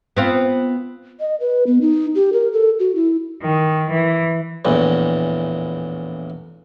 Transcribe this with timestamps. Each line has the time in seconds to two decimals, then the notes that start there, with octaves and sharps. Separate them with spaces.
0.17 B3 C4 F4
1.20 D#5
1.40 B4
1.67 B3
1.81 D#4
2.15 G4
2.33 A#4
2.53 A4
2.79 F#4
2.95 E4
3.42 D#3
3.91 E3
4.65 A#1 E2 A2